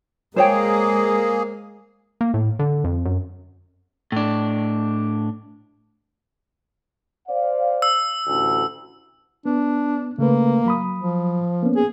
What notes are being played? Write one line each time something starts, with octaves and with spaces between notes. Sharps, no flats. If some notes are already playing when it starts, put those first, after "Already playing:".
G#3 A#3 G#4 A#4 C5 C#5 G5
A#3
A2
D3
F2
F#2
A2 D4
C5 D5 F5
E6
A1 D2
B3 D4
C#3 A3 A#3 B4
F#3 B5 D#6
F3
A#3 B3 C#4
G#4